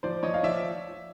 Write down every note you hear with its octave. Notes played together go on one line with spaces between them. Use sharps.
F3 C5 D5
F3 C#5 D#5
F5
F3 D5 E5